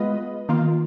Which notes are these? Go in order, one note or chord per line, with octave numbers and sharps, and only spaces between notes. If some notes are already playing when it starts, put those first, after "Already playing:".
Already playing: G#3 B3 F4 B4 D#5
D#3 A#3 F4